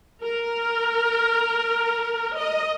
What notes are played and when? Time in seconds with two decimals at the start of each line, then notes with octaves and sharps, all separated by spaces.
0.22 A#4
2.39 D#5